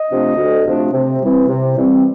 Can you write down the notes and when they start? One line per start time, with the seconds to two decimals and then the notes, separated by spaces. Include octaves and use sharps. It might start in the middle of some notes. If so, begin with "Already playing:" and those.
Already playing: D#5
0.09 C3 F3 A3 D4
0.36 D2
0.64 C3 F3 A3 D4
0.92 C3
1.20 E3 G3 C4
1.48 C3
1.76 E3 G3 C4